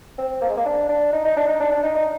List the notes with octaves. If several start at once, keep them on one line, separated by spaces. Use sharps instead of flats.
C4
A#3
G#3
A#3
D4
D4
D#4
D#4
D4
D#4
D4
D4
D#4
D#4